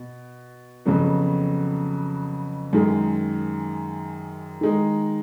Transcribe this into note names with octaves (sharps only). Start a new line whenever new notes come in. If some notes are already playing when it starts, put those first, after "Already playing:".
Already playing: B2
F2 C#3 F#3 B3 F#4
F#2 D#3 G#3
D#3 G#3 D#4